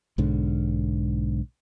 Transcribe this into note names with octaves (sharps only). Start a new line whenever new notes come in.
B1 G#2 D3